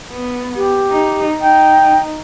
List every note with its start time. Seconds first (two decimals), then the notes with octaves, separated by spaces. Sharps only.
0.12 B3
0.56 G4
0.91 D#4
1.41 D#4 G5